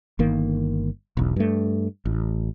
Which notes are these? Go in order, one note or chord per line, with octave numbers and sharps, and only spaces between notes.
G1 D#3 A#3
E1 B1
G2 A3
A1